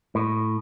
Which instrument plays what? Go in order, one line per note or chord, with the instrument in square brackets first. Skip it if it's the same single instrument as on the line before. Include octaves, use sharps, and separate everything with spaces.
[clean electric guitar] A2